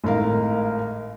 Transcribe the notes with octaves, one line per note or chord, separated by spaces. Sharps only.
G#1 A2 A#4 F5